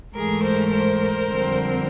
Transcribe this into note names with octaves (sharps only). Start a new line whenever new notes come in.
G#2 E3 A3 G#4 A#4
A#4 C5
A#4 C5
F2 D3 G3 C4